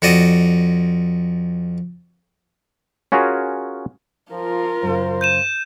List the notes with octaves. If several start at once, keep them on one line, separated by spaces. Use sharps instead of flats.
F2 F#4 D5 D#5
C#4 F4 F#4 G#4 A#4
F3 F4 A#4
F#2 C#3 C5
G6 D#7 E7